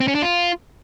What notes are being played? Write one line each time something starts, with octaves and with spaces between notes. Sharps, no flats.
C4
C#4
D4
F4